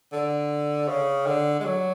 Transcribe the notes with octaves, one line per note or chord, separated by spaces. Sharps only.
D3
C#3
D3
G#3
F#3